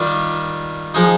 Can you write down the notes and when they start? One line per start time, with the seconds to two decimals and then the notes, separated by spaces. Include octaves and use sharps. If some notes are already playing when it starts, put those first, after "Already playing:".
Already playing: D#3 G3 D4 F4
0.94 F3 G#3 D#4